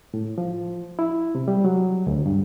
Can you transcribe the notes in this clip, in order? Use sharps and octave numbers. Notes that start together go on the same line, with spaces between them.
A2
F3
E4
C3
G3
F#3
D2
G2